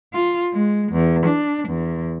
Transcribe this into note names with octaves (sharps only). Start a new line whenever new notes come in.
F4
G#3
E2
D4
E2